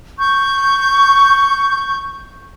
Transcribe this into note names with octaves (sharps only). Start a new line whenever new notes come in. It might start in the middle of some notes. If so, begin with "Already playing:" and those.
C#6 G6